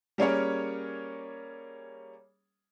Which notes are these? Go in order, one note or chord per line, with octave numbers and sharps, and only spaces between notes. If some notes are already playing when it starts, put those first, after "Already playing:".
G3 A#3 C#4 G#4 A#4 C#5